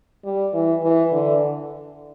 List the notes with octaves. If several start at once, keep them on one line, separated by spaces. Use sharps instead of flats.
G3
E3
E3
D3